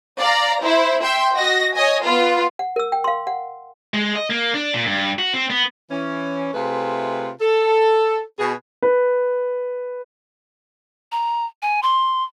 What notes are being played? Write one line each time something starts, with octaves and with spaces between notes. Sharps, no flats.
D5 F5 A#5
E4 C5
E5 G5 C6
F#4 D#5 A#6
C#5 D#5 G#5
B3 F4 B4
F#5
A#4 E6
G5
F5 C6
F#5
G#3
D#5
A#3
D4
A#2
G2
F#4
C4
B3
E3 C#4
C3 A3 F4 G#4 B4
A4
B2 G#4
B4
A#5
G#5
C6